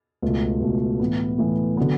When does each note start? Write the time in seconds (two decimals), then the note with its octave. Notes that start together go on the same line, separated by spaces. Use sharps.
0.22 C#2 B2 A3
0.61 C#2 B2 A3
1.00 A2 E3 B3
1.38 A2 E3 B3
1.77 D3 F#3 B3